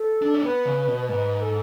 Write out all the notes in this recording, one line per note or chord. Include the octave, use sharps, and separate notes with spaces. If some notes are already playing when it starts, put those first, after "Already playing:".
Already playing: A4
D4
C#4
B3 B4
C#3
B2
G#2 B4
A4